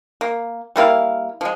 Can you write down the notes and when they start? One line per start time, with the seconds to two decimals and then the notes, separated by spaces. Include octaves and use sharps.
0.21 A#3
0.76 G3 A#3 E4 F5
1.41 F3 G#3